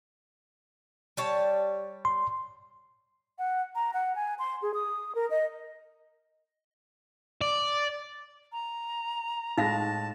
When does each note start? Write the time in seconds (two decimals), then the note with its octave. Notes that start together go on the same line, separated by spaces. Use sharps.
1.17 G3 C#5 A5
2.05 C6
3.38 F#5
3.75 A#5
3.93 F#5
4.15 G#5
4.39 C6
4.62 G#4
4.74 D#6
5.15 A#4
5.30 D#5
7.41 D5 D6
8.52 A#5
9.58 A2 G#3 D#4 F5 A5 A#6